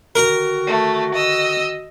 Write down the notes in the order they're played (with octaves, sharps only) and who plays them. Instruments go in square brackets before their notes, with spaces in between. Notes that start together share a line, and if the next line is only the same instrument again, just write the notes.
[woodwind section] D3 D#3 F#4 [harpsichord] A#4 A#5
[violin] A3
D#5 E6